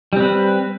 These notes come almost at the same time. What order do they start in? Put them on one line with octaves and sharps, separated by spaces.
G3 C4 B4